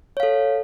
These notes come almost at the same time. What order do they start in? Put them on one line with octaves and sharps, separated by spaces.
C#5 F5 A4